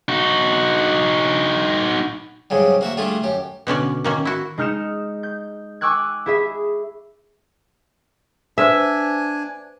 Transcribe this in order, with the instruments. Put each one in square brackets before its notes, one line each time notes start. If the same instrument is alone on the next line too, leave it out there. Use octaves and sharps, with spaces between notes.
[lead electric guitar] D#4 F#4
[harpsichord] G#2 C#3 F#3 G3
A#3 F#4 E5
G3 A3 D4 F4 G#4
F#2 G4
[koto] B2 D3 C#4 D5
D#3 A#3 C#4
E4 F#4
[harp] G#3 D#4 F6 G6 C#7 E7
G6
G#5 C#6 D6 E6 F#6 G#6
E4 G#4 E5
[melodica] D4 G#5 [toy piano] B4 C5 [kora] E5